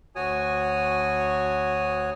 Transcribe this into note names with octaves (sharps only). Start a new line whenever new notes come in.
D2 F#4 C#5 G#5 D#6